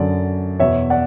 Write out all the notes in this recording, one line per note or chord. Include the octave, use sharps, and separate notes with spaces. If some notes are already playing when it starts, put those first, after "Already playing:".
Already playing: F#2 D3 D5
E2 B2 C#5 E5
D5 F#5